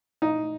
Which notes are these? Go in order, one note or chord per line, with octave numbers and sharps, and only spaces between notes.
D#4